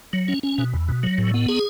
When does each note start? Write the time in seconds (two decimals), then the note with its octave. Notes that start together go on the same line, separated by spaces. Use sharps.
0.13 F#3
0.28 C#4
0.43 C#4
0.58 B2
0.73 E2
0.88 B2
1.03 F#3
1.18 A2
1.34 B3
1.48 G#4